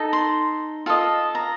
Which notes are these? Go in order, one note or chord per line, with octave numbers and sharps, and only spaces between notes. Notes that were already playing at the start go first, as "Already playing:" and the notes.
Already playing: D#4 A4
C6
F4 A4 D#5
A#5